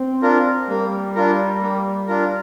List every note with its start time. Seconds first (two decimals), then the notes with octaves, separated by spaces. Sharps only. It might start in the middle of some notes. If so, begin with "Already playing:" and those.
Already playing: C4
0.22 D4 F4 A#4
0.69 G3 A#3
1.15 D4 F4 A#4
1.62 A#3
2.07 D4 F4 A#4